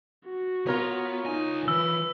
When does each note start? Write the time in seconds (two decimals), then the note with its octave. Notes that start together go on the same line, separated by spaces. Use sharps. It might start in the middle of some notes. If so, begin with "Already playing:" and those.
0.25 F#4
0.67 B3 F4 A#4 C#5
1.26 C#2 D#4 G#5
1.68 E3 B4 E6